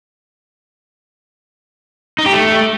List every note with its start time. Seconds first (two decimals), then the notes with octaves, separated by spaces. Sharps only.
2.19 D#4
2.26 G4
2.33 A3